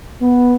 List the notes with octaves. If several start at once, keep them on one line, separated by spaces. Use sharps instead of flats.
B3